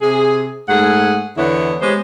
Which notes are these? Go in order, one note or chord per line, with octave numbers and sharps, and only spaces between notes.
C3 G#4
G#2 A3 G#4 F#5
E2 D3 B3 E4 C#5
G#3 B3 G4 C5 C#5